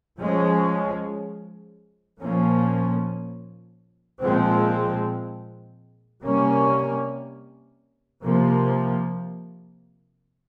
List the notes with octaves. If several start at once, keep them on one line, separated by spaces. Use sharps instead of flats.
F3 G#3 C#4
A#2 F3 A#3 C#4
A#2 F3 G#3 C4
C3 G3 A#3 C#4
C3 F3 A#3